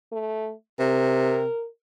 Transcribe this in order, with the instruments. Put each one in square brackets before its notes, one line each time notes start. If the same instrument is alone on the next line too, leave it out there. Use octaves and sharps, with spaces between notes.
[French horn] A3
[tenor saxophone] C3 [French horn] A#4